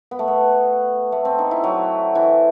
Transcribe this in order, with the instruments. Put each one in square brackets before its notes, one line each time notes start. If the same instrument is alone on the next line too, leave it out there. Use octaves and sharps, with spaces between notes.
[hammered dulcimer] B3
A3
B3
A3
C4
D#4
E4
F#3
E3